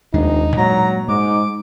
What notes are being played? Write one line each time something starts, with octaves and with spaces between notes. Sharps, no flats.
F1 D#2 G#3 D4 D#4
G2 A#2 F#3 G#3 A#5
G#2 G#3 D#4 D6